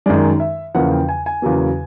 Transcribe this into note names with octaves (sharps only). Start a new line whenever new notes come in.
F#2 D#3 G#3 D5
E5
E2 C#3 F3 A#3 F#5
G5
G#5
G#5
E2 C#3 F#3 A#3